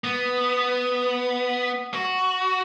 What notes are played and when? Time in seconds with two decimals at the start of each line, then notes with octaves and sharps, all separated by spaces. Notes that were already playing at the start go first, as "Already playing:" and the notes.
0.04 B3
1.94 F#4